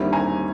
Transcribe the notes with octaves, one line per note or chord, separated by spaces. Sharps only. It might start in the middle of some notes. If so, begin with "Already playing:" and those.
Already playing: D#2 D3 G3 C4 E4
G#5 A#5